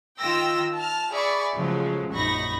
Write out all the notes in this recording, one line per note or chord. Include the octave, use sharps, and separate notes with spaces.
D#3 F4 G5 E6 A#6
A5 F6
G#4 D5 E5 B5 C#6
C#3 F3 F#3 G#3 A3
A#1 F#2 D#4 B5 C#6 A#6